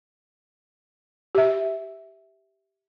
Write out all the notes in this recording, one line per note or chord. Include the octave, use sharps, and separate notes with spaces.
G4 E5